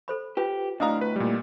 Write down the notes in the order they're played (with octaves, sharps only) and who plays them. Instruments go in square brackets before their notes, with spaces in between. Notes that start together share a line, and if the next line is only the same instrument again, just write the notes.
[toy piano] A4 C5 B5
[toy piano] F4 B4 [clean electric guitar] G4
[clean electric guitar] D2 A2 [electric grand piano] D4 F5 A#5 [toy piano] D#5 D#6
[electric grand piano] B4
A#2 G3